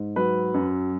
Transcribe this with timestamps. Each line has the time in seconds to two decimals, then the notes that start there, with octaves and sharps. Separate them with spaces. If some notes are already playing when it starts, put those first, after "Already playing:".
Already playing: G#2
0.16 F#3 B4
0.54 F#2